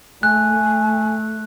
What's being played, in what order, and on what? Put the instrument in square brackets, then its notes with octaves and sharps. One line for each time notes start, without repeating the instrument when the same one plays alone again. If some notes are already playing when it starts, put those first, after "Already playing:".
[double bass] A3 [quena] G#5 [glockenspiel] F#6